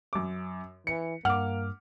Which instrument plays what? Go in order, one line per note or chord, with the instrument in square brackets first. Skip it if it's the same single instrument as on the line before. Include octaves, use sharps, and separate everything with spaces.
[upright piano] F#2 D6
[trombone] E3 [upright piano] C#7
[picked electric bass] G2 [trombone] A#3 [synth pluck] F#5 [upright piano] D6 F6